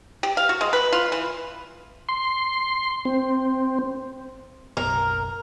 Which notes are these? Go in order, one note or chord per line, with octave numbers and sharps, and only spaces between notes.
G4
F5
F#4
G#3
B4
F4
E3
C6
C4
F#1 B1 A#4